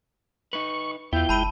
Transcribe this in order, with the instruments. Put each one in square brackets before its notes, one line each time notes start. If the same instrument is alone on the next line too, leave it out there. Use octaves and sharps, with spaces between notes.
[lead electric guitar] D#4 B4 [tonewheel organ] C#6
[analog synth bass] E2 [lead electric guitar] B3 F4 [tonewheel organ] E4 G5 G6
[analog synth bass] F#1 [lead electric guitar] G#3 [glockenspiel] A5 B5 D#7